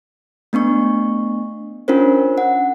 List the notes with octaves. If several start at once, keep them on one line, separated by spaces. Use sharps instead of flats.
A3 B3 D4 C#6
C#4 D4 F4 A#4 C5
F#5